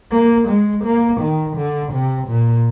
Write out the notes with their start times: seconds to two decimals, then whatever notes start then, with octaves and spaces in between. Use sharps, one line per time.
0.11 A#3
0.49 G#3
0.85 A#3
1.21 D#3
1.57 D3
1.93 C3
2.28 A#2